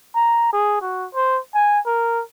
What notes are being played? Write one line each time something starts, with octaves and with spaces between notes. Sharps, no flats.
A#5
G#4
F#4
C5
G#5
A#4